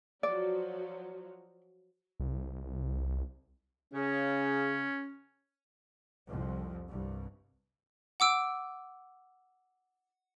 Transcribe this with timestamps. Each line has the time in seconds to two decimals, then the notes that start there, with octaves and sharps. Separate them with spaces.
0.23 F3 F#3 F#4 D5
2.20 C2
3.93 C#3 C#4
6.30 C2 F2 F3
6.90 C2 G2
8.20 F#5 D6 E6 D7